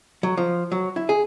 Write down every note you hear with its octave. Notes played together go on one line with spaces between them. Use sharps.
F#3
F3
F#3
E4
G#4